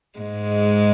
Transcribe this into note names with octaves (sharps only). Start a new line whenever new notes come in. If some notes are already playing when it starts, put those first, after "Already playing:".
G#2 G#3